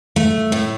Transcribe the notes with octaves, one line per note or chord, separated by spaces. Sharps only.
A3
A2